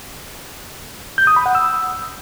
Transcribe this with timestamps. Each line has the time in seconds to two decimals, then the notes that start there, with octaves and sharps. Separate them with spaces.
1.18 G6
1.27 D#6
1.36 B5
1.46 F#5
1.55 E6